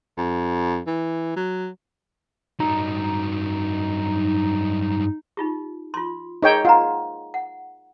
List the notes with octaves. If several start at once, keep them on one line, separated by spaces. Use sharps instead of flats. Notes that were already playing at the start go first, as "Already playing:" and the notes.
F2
E3
F#3
G2 F#3 D#4
D#4 F4 G4
F4 C6
D#4 G#4 A#4 C#5 G5
F4 F#5 A#5
F#5